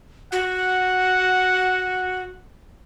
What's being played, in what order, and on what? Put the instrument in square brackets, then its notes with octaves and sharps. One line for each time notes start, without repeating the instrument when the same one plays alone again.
[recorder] F#4 [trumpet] F#5